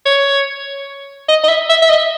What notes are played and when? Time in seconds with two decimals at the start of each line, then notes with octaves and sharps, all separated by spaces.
0.06 C#5
1.28 D#5
1.44 D#5
1.49 E5
1.69 E5
1.82 E5
1.90 D#5